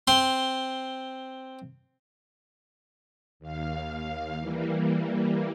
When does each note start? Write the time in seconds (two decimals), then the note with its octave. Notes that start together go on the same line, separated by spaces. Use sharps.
0.07 C4 C6
3.40 D#2 F5
4.40 E3 G3 A#3